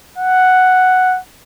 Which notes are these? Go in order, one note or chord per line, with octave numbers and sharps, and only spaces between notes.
F#5